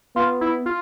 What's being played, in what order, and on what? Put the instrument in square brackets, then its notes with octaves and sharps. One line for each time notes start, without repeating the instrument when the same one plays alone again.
[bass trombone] B3 [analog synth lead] F4
[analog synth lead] E4
F4